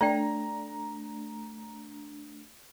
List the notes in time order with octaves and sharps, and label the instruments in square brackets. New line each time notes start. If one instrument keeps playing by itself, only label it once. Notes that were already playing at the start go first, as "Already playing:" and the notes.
[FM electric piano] A3 D4 [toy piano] C#5 D5 G5 [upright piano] A#5